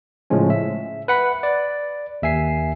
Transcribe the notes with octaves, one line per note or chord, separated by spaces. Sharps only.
A2 C#3 F3 G#3 C#4
E5
B4 F#5 B5
D5
D#2 E5 G#5 C7